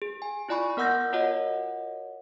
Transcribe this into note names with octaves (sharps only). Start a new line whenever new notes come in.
G#4
G#5
E4 F4 D5 G#5 B5 C#6
B3 A#4 F#5 E6 G6 A#6
F4 F#4 A#4 C#5 D#5 F#5